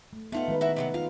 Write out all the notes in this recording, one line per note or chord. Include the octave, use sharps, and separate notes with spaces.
A3
A3 B3 D#4 F4 F#5
D#3 G#3 B4
E4 F#4 E5
C3 F#3 B3
F4 F5